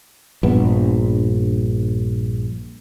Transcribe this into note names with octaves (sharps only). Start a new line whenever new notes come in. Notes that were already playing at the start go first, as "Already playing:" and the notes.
A#1 G2 B3